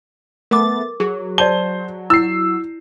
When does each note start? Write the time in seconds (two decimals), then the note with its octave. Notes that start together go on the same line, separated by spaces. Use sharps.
0.51 A3 B3 A#4 D6 A6
1.00 F#3 G#4
1.38 C5 D5 A5 G7
2.10 E4 E6 C7